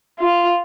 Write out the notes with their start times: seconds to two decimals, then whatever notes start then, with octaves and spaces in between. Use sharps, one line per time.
0.19 F4